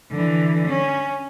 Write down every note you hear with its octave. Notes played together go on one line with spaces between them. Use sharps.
D3 E3
C#4